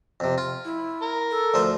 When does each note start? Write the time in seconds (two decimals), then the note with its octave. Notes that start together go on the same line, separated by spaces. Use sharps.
0.20 F2 C3
0.38 F4
0.65 E4
1.02 A#4
1.31 A4
1.54 D2 F3 C5